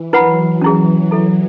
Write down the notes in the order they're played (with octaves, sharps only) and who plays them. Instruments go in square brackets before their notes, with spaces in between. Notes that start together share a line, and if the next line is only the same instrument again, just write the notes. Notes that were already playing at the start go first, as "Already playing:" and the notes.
Already playing: [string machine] E3
[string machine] F#3 [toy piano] E4 B4 F#5 B5
[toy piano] C#4 E4 G#4
E4 A4 E5